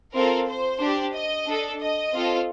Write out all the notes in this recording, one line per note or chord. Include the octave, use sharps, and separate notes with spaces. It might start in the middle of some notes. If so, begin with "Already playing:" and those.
C4 F4 A4 A#4
C5
D4 G4
D#5
D4 A4
D#5
C4 F4 A4